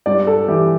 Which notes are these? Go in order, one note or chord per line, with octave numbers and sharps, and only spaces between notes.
G2 D5
A4
E3 G4